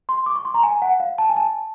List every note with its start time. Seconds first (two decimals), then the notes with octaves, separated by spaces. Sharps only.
0.09 C6
0.26 D6
0.36 C#6
0.45 C6
0.54 A#5
0.63 G#5
0.82 F#5
1.00 F5
1.18 A5
1.29 G#5
1.36 A5